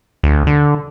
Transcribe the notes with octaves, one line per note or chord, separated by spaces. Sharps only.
D2
D3